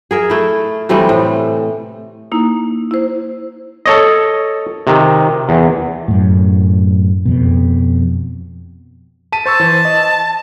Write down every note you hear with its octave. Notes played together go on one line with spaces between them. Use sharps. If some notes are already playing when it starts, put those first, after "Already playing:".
G#4 A#4 E5
A3 E4
C3 E3 G3 A3
A2
A#3 D#4 E4
E4 C5
A4 C#5 D#5
C3 D#3
E2
F#2 A2
F2 B2
A5 B6 D#7
C5 A5 C#6 E6
E3 C5
D#5